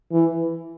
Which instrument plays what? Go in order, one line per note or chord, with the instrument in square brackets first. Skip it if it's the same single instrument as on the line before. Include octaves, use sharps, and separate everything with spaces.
[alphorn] E3